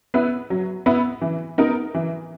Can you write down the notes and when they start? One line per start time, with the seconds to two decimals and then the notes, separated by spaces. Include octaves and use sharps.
0.14 B3 E4 B4
0.50 F#3
0.86 B3 E4 B4
1.22 E3
1.58 B3 D#4 A#4
1.94 E3